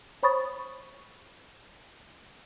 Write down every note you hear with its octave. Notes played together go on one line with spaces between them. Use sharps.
C5 C#5 B5 C#6 D#6 A6